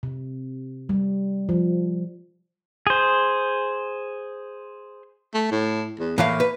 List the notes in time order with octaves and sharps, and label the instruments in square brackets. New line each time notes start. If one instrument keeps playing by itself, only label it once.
[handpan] C3
G3
F3
[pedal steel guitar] G#4 C5
[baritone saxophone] A3
A2
E2
[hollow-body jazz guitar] A2 E3 F5 [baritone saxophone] A#3
[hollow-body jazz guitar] B4